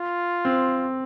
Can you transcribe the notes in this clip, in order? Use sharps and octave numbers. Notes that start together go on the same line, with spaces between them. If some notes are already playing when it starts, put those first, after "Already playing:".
Already playing: F4
C4